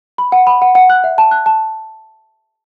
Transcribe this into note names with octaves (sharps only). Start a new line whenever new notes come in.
B5
F#5
B5
F#5
F#5
F#6
E5
A5
F#6
A5